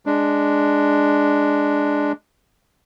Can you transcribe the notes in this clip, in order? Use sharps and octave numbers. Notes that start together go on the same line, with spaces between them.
G#3 D4